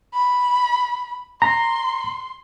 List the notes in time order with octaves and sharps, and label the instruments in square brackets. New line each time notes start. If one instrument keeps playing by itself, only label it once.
[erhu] B5
[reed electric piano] A#5 [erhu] C6